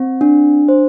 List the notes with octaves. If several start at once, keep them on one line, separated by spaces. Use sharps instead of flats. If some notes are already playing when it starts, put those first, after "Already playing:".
Already playing: C4
D4
C5